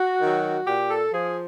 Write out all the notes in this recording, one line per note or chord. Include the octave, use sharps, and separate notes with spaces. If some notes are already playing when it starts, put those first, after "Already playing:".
Already playing: F#4
D#3 F#3
A#2 G4
A4
F3 G#4